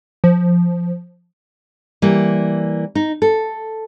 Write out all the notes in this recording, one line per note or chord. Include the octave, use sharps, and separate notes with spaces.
F3
E3 G3 A#3
D#4
A4